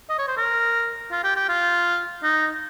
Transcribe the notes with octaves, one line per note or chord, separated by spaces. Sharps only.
D#5
C#5
C5
A#4
F4
G4
G4
F4
D#4